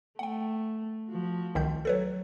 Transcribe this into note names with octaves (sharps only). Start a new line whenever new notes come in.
A3 F#5 G5
F3 F#4
C2 D#3 G6
F#3 A4 B4 C#5